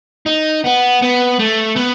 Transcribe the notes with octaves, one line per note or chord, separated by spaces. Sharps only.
D#4
B3
B3
A3
B3